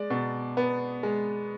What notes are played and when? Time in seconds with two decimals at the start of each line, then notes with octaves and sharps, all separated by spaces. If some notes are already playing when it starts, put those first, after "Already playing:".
Already playing: G#3 D5
0.10 B2
0.57 B3
1.03 G#3